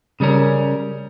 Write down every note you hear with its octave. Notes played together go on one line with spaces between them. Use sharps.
C#3 G3 C#4 A#4